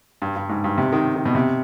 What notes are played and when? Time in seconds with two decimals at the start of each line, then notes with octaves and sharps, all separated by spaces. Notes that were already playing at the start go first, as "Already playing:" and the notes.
0.22 G2
0.36 G2
0.49 G#2
0.64 G2
0.78 C3
0.93 D#3
1.16 D#3
1.25 B2
1.35 C3